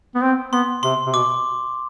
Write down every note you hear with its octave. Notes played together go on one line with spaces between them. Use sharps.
B3
C4
B3 C6
C3 C6
C3
B2 D6